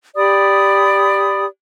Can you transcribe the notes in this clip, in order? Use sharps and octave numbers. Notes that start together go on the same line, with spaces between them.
G4 D5 B5 D#6